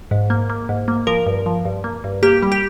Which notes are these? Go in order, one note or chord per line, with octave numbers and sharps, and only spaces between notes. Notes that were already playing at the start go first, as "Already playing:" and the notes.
G#2
A#3
A#3
G#2
A#3
F3 A#4
G2
F3
G2
A#3
G2
A#3 G4
G3
G4